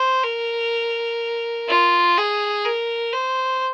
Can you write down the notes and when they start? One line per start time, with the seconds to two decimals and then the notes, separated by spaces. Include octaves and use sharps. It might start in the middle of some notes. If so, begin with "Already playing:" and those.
Already playing: C5
0.24 A#4
1.68 F4
2.17 G#4
2.65 A#4
3.13 C5